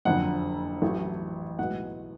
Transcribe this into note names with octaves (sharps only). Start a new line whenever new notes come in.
F#1 F2 D3 F#5
A1 A2 F#3 A3
B1 A2 E3 G#3 F#5